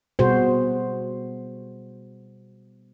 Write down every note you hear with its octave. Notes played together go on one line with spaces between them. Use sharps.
B2 G3 B3 F#4 G#4 C5